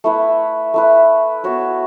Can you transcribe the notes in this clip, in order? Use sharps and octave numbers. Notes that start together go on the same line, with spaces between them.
A3 E4 B4
A3 E4 B4
B3 F#4 C#5 E5